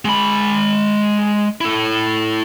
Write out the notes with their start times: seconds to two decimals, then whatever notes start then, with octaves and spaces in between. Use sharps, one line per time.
0.05 G#3 B5
1.61 E4 A4